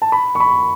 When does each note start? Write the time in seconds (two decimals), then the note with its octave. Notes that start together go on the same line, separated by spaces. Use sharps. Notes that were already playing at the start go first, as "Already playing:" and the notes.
0.02 A5
0.12 B5
0.35 C#6
0.40 B5